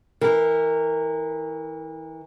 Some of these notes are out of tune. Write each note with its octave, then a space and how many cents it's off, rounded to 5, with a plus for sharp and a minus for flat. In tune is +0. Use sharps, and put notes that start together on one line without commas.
E3 -30 A#4 -15